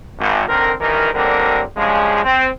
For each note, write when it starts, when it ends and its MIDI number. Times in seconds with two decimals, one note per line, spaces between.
0.18 0.47 32
0.48 0.72 50
0.48 0.72 51
0.48 0.72 60
0.48 0.72 70
0.79 1.09 32
0.79 1.09 43
0.79 1.09 51
0.79 1.09 52
0.79 1.09 70
1.13 1.61 39
1.13 1.61 45
1.13 1.61 50
1.13 1.61 55
1.13 1.61 60
1.13 1.61 70
1.76 2.20 43
1.76 2.20 49
1.76 2.20 53
1.76 2.20 56
2.24 2.47 60